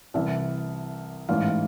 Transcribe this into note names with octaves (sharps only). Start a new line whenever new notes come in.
C2 C3 E3 E5
A1 G#2 E3 F5